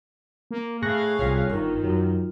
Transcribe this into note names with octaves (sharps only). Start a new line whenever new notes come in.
A#3
A2 G#4 F5 C#6 F#6 A#6
C2 G3 F4 C#5
G1 D#3 F4
F#2 F#3